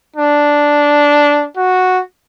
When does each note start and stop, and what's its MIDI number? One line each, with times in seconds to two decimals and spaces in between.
0.16 1.46 62
1.57 2.00 66